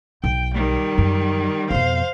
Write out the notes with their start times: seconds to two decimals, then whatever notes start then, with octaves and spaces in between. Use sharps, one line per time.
0.24 B1 G5
0.55 D#3 G3
0.98 F#2
1.71 F2 B2 C5 F5